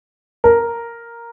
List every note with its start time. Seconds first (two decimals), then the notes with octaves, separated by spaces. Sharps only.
0.44 A#4